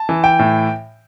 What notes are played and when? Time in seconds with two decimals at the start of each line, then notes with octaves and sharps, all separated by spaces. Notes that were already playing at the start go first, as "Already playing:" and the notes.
Already playing: A5
0.09 E3
0.24 G5
0.39 A2